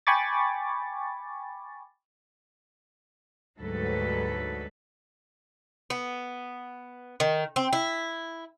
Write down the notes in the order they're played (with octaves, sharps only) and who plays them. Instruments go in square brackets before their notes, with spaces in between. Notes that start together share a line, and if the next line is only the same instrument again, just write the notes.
[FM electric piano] G5 G#5 B5 C#6 D6 A6
[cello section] D2 G#2 F#3 G3 A4 B4
[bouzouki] B3
D#3
C4
E4